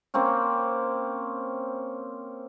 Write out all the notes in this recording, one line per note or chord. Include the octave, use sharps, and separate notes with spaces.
A#3 C4 C#4